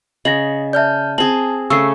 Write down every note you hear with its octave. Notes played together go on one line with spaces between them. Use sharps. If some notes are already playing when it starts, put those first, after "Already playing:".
C#3 D#5 A#6 F#7
D5 E5 A5 F6 G6
C4 G#4 A5 F#7
C#3 A3 C#6 E6 C7